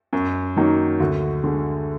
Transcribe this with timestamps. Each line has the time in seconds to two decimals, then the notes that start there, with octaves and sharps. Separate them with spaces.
0.13 F#2
0.56 D#3 F#3 A#3 D#4
1.00 D2 F#4
1.44 D3 G#3